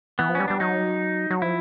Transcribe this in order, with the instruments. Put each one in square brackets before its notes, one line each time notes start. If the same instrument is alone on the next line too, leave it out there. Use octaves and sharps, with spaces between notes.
[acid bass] E3 [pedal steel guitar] B3
[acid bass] F3
[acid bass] G3 [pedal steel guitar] C#4
[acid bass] G3 [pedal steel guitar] D4
[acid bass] F#3 [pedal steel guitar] D#4
[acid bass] F#3
[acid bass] F3 [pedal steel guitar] E4